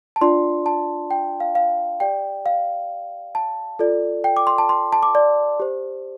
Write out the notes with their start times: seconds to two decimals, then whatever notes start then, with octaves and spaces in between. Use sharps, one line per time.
0.16 A5
0.21 D4 F4 D5 C6
0.66 A5
1.11 G5
1.40 F5
1.55 F5
2.00 G4 D5 G5
2.46 F5
3.35 A5
3.79 F4 A4 D5
4.24 G5
4.37 D6
4.47 C6
4.58 A5
4.69 C6
4.93 A5
5.03 D6
5.15 D5
5.60 G4 C5